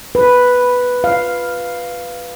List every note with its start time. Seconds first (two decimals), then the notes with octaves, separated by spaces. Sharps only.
0.15 B4
1.04 F5